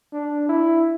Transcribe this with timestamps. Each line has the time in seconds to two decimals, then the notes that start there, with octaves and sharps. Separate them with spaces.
0.13 D4
0.49 E4